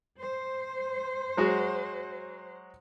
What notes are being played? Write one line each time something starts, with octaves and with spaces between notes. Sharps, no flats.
C5
F#3 G#3 F#4